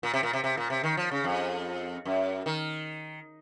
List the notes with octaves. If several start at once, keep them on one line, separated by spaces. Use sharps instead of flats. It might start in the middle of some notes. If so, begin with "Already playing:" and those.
A#2
C3
A#2
C3
C3
A#2
C3
D#3
F3
C#3
F2
F#2
D#3